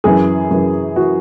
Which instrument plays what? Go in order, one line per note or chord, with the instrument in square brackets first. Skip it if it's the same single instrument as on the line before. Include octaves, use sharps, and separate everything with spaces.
[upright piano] F#2 E3 G#4
F#2 E3
E3 F#4